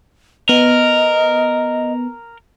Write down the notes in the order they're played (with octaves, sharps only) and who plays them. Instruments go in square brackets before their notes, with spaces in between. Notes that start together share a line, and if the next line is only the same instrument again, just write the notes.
[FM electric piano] B3 [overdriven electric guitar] A#4 [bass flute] D#5